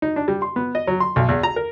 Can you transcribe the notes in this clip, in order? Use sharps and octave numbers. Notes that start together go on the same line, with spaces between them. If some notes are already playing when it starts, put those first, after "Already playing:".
D#4
D4
G3
C6
B3
D#5
F#3
C6
B1
E2
A#5
A#4